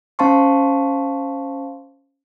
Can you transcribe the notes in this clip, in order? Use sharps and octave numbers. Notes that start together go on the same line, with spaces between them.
C#4 C5 F5 A5 C6 C#6